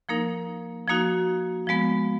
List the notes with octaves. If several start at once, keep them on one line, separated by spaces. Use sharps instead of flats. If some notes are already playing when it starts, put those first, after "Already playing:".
F3 A#3 D#4 A#4
F3 A#3 D#4 F#4
F3 G#3 B3